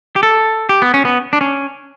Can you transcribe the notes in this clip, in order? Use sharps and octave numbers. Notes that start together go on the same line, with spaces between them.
G4
A4
G4
B3
C#4
B3
D4
C#4